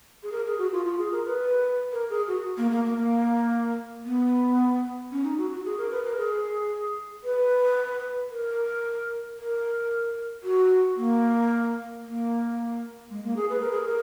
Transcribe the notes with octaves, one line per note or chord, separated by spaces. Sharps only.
G#4
A#4
G#4
F#4
F4
F4
G#4
A#4
B4
A#4
G#4
F#4
A#3
A#3
A#3
A#3
B3
C#4
D#4
F#4
F#4
G#4
A#4
B4
A#4
G#4
B4
A#4
A#4
F#4
A#3
A#3
G#3
A#3
G#4
B4
A#4
G#4
A#4